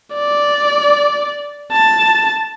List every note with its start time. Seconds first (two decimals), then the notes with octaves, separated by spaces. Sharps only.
0.15 D5
1.72 A5